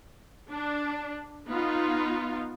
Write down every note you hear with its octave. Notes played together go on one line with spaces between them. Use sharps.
D4
B3 D#4 F4